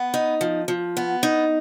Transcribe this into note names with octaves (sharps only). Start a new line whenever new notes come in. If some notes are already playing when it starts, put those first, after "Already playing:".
Already playing: B3
D#4
F3
F3
B3
D#4